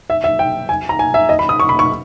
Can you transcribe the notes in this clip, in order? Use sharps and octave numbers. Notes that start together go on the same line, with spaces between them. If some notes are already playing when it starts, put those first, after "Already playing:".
E5
E5
G5
G#5
A#5
G#5
E5
D#5
B5
D#6
C#6
B5
C#6